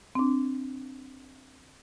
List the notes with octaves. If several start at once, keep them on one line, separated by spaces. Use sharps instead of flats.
C4 D4